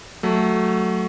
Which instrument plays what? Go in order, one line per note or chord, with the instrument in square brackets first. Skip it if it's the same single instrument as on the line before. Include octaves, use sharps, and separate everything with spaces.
[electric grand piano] F#3 A3